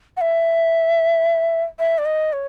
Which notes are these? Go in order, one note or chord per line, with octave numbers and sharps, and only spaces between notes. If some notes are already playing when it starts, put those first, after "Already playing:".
F#5
E5
E5
D5
D#5
C#5